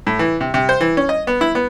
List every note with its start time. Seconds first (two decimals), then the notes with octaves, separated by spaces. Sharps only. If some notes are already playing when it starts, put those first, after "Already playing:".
0.07 A2
0.19 E3
0.41 C3
0.54 C3
0.69 C5
0.81 E3
0.97 C#4
1.09 D#5
1.27 B3
1.41 E4
1.55 B3